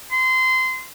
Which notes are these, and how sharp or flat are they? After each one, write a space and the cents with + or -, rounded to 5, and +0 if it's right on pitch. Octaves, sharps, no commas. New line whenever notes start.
C6 -20